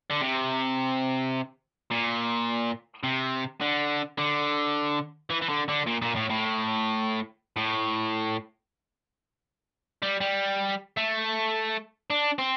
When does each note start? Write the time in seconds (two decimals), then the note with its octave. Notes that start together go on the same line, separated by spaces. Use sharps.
0.11 D3
0.22 C3
1.91 A#2
3.04 C3
3.61 D3
4.18 D3
5.30 E3
5.42 E3
5.49 D3
5.69 D3
5.87 A#2
6.02 A#2
6.16 A2
6.30 A2
7.57 A2
10.03 G3
10.21 G3
10.97 A3
12.10 D4
12.38 C4